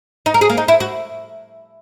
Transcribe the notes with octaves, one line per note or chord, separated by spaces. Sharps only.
D#4
A#4
G#4
A#3
D#4
E4
F#4